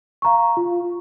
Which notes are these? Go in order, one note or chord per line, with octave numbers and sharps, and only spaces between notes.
F5 A#5 C#6
F4